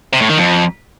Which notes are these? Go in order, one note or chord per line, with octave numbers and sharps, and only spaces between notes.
C3
A2
D#3
F2